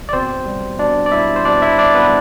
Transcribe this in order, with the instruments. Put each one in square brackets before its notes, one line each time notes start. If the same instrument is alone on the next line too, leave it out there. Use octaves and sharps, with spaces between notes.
[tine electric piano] D5
B2 C4 C5
G3
B2 D4 D5
D5
G3 E4 E5
C5
B2 D4 D5
E4 E5
G3 D4 D5
B3 B4